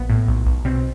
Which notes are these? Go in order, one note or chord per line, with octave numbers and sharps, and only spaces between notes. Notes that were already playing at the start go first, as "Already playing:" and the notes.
Already playing: A#1 B3
A2
B1
B1
B2 C4